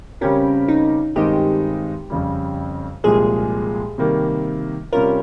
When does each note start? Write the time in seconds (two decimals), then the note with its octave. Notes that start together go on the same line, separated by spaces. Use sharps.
0.21 C#3 G3 C4 C#4 G4 A#4
0.68 D#4
1.16 G2 D#3 G#3 C4 D#4 G4
2.10 F2 C#3 G3
3.04 C2 A#2 F3 G#3 G#4
3.98 C3 D#3 G3 A#3
4.92 C3 G3 C#4 F4 A#4